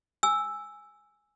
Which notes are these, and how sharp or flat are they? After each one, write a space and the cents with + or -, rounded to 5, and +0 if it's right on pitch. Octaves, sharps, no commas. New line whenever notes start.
G#5 +0 E6 +0